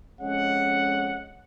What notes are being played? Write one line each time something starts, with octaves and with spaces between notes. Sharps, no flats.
F2 G#3 C#4 F#5